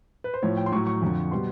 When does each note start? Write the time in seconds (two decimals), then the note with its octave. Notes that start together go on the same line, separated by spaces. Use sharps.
0.24 B4
0.34 C5
0.43 A2 F3 C#5
0.57 G5
0.66 C6
0.72 A2 F#3 C#6
0.87 C#6
1.02 F2 D3 F3
1.31 B2 G3 C6